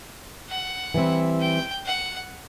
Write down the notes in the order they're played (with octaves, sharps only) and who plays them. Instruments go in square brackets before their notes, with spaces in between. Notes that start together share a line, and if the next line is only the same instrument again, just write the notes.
[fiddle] F#5
[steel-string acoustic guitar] E3 G3 C4 E4
[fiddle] G5
F#5